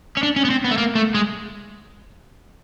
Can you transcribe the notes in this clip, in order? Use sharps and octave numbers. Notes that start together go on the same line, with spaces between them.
C#4
D4
C#4
B3
C4
B3
A3
A#3
A3
G#3